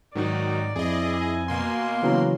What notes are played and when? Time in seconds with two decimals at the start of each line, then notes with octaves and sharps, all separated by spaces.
0.15 G#2 D#3 F#3 D#4 D5
0.76 F2 E4 G#4 D#5
1.16 G#5
1.48 B2 A#3 F5 C6
2.03 C#3 E3 F#3